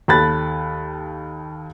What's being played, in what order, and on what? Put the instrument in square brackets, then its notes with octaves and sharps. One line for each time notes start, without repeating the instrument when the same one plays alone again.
[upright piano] D#2 A4 B5 F#6 A6